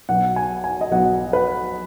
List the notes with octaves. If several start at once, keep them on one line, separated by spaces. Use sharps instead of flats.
B1 B2 F#3 B3 F#5
G#5
G#5
D#5
B1 B2 F#3 B3 F#5
B4